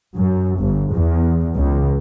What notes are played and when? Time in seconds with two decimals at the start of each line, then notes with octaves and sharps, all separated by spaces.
0.15 F#2
0.59 G1
0.93 E2
1.55 C#2